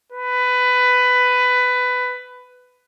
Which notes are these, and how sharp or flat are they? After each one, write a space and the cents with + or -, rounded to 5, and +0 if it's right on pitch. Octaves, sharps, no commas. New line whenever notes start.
B4 +15